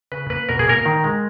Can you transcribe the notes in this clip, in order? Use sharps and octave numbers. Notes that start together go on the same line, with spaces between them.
C#3 B4
A#3 B4
B2 A#4
G#4
A#3 A#4
D#3
G#3